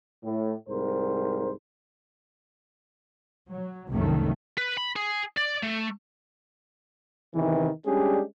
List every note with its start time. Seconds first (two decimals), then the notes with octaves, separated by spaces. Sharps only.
0.24 A2
0.68 C2 G#2 A#4 C5
3.50 F#3
3.92 F1 C2 F#2 D#3 A3
4.58 B4
4.77 B5
4.96 G#4
5.37 D5
5.63 A3
7.34 E2 C3 D#3 E3
7.86 G3 G#3 C#4 D4 G4 G#4